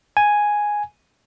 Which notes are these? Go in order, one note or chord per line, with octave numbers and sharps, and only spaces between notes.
G#5